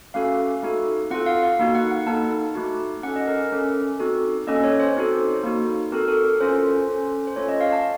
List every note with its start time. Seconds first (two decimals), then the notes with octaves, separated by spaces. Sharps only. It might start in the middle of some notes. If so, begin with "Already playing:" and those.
0.14 A3 C#4 F#4 A4 F5
0.63 A3 D#4 F#4 A4
1.10 C4 F4 A4 F#5
1.26 F5
1.43 F5
1.59 A#3 D#4 F#4
1.75 F#5
1.91 F#5
2.06 A#3 D#4 A4 A5
2.55 A3 D#4 F#4
3.03 C#4 A4 F#5
3.16 D#5
3.27 A#4
3.52 A3 C#4 A4
3.99 C4 D#4 F#4 A4
4.47 A#3 C#4 A4 D#5
4.64 C#5
4.80 C5
4.96 C4 D#4 F#4 A4
5.43 A#3 D#4 F#4
5.92 C4 F#4 A4 A#4
6.08 A4
6.25 A#4
6.40 C#4 F4 A4 C5
6.88 C#4 A4
7.27 C5
7.36 A3 C#4 F4 A4 C#5
7.49 D#5
7.61 F5
7.73 A5